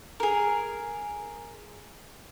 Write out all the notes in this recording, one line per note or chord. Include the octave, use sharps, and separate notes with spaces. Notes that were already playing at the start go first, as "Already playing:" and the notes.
G#4 A#4